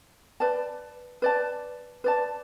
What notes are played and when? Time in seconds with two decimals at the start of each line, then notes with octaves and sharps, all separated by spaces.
0.40 B4 D5 A5
1.22 B4 D5 A5
2.04 B4 D5 A5